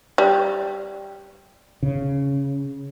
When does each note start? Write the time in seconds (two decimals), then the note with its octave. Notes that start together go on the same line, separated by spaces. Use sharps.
0.18 G3
1.83 C#3